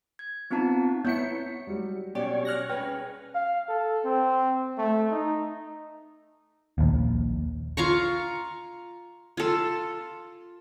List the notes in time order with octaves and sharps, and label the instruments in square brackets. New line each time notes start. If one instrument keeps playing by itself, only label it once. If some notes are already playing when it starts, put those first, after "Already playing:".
[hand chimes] G#6
B3 C4 D#4 F4 A5 A#5
[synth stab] B3 E4 C#7 [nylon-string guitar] C#5 [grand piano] G6 B6
[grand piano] F#3 G3
[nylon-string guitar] B2 D5 [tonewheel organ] C#4 C#5 [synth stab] G4
[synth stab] F6 F#6 A#6
[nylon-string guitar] G#4 B4 [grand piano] G5
[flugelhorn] F5
A4
C4
A3
D#4
[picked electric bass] A#1 D#2
[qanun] F4 F5 A#5 C#6
F4 A4